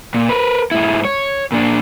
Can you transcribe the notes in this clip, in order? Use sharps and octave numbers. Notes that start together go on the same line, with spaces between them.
A#2
A#4 B4
G#2 E4
C#5
A#2 D4